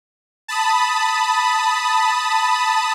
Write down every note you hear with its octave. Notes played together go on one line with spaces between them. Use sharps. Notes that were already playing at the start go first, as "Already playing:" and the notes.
A5 B5 D#6